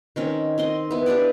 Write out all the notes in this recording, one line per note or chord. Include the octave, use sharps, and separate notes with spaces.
D#3 C4 C#4
C4 D#5 C6
B3 E4
D4 G4 B4 D5